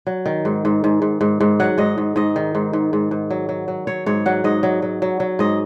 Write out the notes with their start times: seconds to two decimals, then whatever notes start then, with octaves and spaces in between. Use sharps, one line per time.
0.07 F#3
0.26 D#3
0.45 G#2
0.65 G#2
0.84 G#2
1.02 G#2
1.21 G#2
1.41 G#2
1.60 F#3 F#5
1.78 G#2 D#5
1.98 G#2
2.16 G#2 D#5
2.36 D#3
2.55 G#2
2.73 G#2
2.93 G#2
3.11 G#2
3.31 F#3
3.49 F#3
3.68 F#3
3.87 F#3 C#5
4.06 G#2 C#5
4.26 F#3 F#5
4.44 G#2 D#5
4.63 F#3
4.82 F#3
5.02 F#3
5.20 F#3
5.39 G#2 D#5